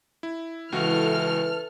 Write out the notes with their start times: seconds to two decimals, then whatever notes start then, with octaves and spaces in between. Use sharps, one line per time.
0.23 E4
0.72 C#2 E3 F#4 A4 F6